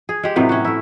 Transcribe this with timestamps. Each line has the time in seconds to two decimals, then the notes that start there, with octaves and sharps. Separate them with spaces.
0.09 G#4
0.23 G#3 G4
0.36 A2 C3 F#3 B4
0.49 C#4 F#4
0.65 A3 E4